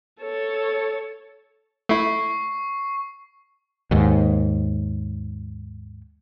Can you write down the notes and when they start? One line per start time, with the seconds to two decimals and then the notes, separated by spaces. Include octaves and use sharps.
0.21 A4 C#5
1.89 A3 E4 C#6 C7
3.91 D#2 G#2